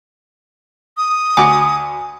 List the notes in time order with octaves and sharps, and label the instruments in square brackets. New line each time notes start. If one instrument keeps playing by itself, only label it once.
[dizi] D#6
[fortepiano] D2 F#4 D6 [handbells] G#5